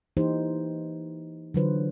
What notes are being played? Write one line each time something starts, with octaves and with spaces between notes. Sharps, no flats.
E3 A#3 D#4 G4 C5
D3 E3 F#3 F4 B4 C5